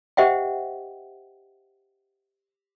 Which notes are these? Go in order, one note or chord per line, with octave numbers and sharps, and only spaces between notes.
G4 C5 D#5 E5 F#5 G5